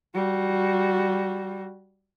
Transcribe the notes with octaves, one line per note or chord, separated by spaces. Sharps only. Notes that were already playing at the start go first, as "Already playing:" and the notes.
G3 F#4